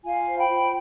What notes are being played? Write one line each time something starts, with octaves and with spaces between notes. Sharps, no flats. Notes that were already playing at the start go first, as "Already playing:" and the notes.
F4 F5 G#5
C5
G5 B5
F4